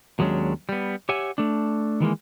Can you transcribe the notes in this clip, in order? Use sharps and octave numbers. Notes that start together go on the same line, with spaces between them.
D#2 F#3 G#3 C#4 D4
G3 B3
G4 C#5 E5 F#5 G#5
A3 D4
D#3 E3 G#3 A#3